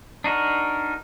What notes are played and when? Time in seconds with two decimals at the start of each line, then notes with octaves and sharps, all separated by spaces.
0.24 D4 D#4 F#4 A#4